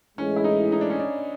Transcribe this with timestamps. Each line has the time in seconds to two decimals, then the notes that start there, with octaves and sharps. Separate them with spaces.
0.18 A2 E3 G#3 C#4
0.36 E4
0.44 D#4
0.72 D#4
0.81 D4
0.90 C#4
1.00 D4